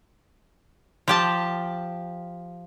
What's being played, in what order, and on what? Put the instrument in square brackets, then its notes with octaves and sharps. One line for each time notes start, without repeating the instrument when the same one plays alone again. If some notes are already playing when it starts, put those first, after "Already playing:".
[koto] F3 G4 A5